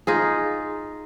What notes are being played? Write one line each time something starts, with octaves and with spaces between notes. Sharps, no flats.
D#4 F4 G#4